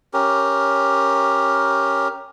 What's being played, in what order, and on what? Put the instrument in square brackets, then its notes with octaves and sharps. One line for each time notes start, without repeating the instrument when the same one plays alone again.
[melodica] C#4 G4 A#4